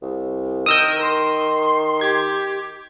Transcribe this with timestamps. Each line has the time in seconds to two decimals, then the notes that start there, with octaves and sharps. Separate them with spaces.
0.02 C2
0.66 D#3 A#4 D#6 E6 G6
1.01 C6
2.01 G4 G#6